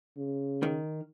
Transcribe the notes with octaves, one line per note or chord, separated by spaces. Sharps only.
C#3
D#3